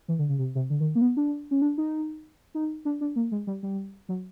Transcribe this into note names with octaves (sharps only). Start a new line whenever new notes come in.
E3
D3
C#3
C3
C3
D3
D#3
A#3
B3
D4
C#4
D4
D#4
D#4
D4
D4
A#3
G#3
G3
G3
F#3